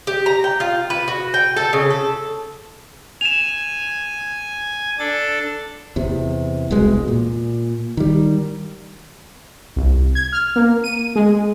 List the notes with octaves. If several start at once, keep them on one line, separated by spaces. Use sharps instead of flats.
G4
A#5
G5
F4
B4
F#4
G5
A4
C#3
A4
G#5 E7 F7
D4 A4 A6
E2 C3
E1 C2 B2 G#3
A#2
D#3 G3
C2
G#6
F6
A#3
D#7
G#3